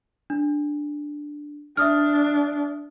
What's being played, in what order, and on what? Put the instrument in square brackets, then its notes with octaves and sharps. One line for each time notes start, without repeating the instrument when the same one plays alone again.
[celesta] D4
[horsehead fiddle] D4 [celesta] E5 D#6 F6